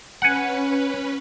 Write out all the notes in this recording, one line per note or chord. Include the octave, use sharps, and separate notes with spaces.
C#4 B4 F#5 G#5